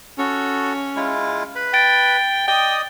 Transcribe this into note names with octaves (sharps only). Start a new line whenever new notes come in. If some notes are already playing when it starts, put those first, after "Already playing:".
C#4 F#4 A4
G#3 E4 F4
B4 B5
G5 A6 D7
D5 D#5 G5 D#6